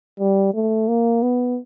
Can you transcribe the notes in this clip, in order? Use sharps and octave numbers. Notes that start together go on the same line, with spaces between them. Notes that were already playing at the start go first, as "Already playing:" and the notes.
G3
A3
A#3
B3